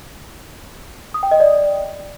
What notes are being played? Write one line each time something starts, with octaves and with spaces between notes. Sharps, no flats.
D#6
G5
D#5
D5